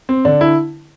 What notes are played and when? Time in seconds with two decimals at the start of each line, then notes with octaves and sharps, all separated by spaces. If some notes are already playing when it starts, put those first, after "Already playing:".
0.09 C4
0.25 D3 D4
0.41 E4